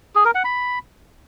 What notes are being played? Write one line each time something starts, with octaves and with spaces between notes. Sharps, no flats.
G#4
A#4
F#5
B5